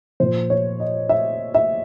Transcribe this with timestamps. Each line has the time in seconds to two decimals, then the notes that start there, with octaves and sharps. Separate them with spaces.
0.20 A#2 F3 C5
0.50 C#5
0.80 D#5
1.09 E5
1.55 E5